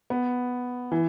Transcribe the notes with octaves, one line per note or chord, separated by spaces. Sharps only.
B3
E3